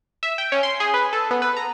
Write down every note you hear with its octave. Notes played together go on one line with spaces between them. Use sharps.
E5
G5
C#4
C6
G#4
B4
A4
B3
B4
A#5